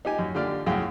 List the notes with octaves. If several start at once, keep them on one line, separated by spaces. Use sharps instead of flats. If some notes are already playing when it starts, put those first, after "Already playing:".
D#4 G4 G#5
F#2
D3 F4 G4 D5 F6
C2 F#2 F#4 G#4 F5 G5